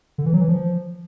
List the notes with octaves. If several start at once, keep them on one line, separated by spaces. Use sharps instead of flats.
D3
E3
F#3
E3
F3